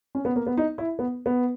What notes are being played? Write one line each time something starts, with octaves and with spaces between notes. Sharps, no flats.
C#4
B3
A#3
B3
D#4
E4
B3
B3